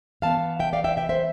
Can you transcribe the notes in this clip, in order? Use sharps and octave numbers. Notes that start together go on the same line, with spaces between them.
E3 B3 F5 A5
E5 G5
D5 F5
E5 G5
E5 G5
C5 E5